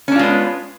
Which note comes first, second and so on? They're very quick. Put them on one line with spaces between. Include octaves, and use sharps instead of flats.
C#4 D4 F4 G#3 B3